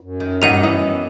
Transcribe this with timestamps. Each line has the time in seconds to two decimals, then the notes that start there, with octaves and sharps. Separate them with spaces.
0.01 F#2
0.20 D#3
0.42 A1 G2 A#2 D#3 D#5 F#5 D#7 F7
0.63 E3 B3 D#5